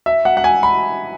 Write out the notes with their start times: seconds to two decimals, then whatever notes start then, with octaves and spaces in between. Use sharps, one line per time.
0.06 E5
0.25 F#5
0.37 F#5
0.44 G#5
0.63 B5